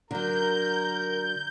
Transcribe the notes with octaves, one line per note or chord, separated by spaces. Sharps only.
D3 F#3 A#4 G6